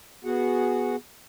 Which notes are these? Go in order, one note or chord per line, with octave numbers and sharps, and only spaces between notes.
B3 F#4 G#4 F#5